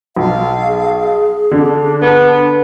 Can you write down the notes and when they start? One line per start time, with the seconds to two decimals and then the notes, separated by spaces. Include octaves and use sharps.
0.16 B1 F5
0.66 G#4
1.51 D3 D4
2.02 B3